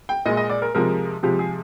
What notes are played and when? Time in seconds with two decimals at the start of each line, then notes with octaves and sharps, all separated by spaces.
0.09 G5
0.26 A#2 G#3 D#5
0.37 D#5
0.50 D5
0.62 A#4
0.75 C3 F3 G#3 A#4
1.23 C3 F3 G#3 G4
1.39 G#4